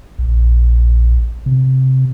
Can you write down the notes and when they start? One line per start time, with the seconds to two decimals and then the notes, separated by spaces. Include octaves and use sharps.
0.19 A#1
1.46 C3